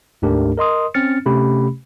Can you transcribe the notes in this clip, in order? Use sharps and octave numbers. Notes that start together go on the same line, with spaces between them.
D2 G#2 A3 D4 G4 A#4
A#4 D#5 C6 D#6
C4 C#4 F6 A6 C#7
C3 A3 C#4 G4 B5